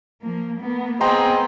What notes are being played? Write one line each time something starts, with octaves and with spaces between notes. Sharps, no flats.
F3 A#3
A#3 B3
B3 C4 G#4 D#5 G5 A#5 C6